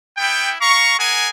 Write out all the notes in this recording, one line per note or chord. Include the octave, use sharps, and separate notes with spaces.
B3 E4 G5
F5 A#5 C#6
G#4 A#4 F#5 G#5